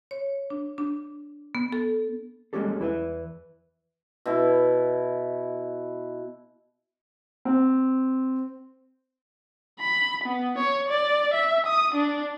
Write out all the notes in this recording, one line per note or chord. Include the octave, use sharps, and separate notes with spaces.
C#5
D4
D4
B3
A4
G3 G#3 A#3 C#4 G4 A4
E2 E4 B4 E5
B2 E4
C4
B5
B3
C#5
D5
E5
D#6
D4